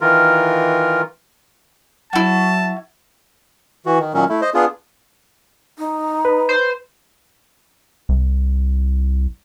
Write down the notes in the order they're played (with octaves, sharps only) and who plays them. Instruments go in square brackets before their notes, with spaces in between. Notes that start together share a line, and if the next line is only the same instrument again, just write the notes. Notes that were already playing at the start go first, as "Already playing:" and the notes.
[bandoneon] D#3 E3 F4 A#4
[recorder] F#3 [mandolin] E4 F#4 [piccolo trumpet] A5
[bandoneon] E3 F#4
D#3
A#2 D#3 F#3 C#4
A3 E4
C5 D#5
B3 D4 F4 G#4
[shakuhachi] D#4
[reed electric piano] B4
[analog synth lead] C5
[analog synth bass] C2